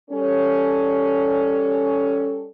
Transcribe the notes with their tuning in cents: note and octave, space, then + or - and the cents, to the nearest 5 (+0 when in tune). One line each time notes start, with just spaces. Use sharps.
G3 +0 C#4 +5 A4 +0